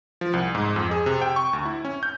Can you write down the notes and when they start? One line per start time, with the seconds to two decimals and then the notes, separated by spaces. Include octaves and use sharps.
0.21 F3
0.33 C2
0.55 G#2
0.76 F2
0.91 G#4
1.06 C3
1.22 G5
1.36 C#6
1.53 D2
1.65 E4
1.85 C#4
2.03 G6